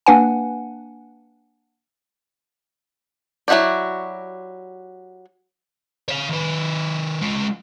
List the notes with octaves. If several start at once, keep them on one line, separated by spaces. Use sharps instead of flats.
A#3 D4 B4 F#5 G#5
F#3 E4 F#4 G4 D5
C#5 F5
D#3 B4
G#3 F4